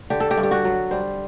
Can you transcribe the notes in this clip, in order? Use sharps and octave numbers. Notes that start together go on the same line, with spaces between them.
D3 G4
A4
G4
G2
G4
F#4
F#3
G3 C5